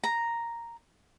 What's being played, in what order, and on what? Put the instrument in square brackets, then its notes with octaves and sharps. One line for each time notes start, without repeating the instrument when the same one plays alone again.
[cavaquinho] A#5